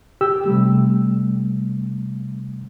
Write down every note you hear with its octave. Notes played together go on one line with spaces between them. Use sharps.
G4 E6
C3 G3 A3